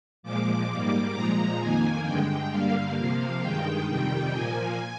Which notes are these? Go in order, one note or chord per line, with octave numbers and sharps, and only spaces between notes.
A#2 F3 G#3 D6
G#2 G3 A#3
A#2 F3 G#3 A#5
F2 D#3 A#3 G#5
G2 D3 G#3 G5
G2 D3 G3 A#3 F5
C3 F3 A#3
G2 D#3 G#3 G5
F2 C3 D#3 G3 G5
A#2 F3 A#3 G#5